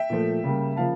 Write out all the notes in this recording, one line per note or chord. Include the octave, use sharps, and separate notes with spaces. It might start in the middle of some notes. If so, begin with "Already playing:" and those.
Already playing: E5 G5
A#2 F3 A3
C#3 G3 A#3
C#3 F3 A#3 F5 A5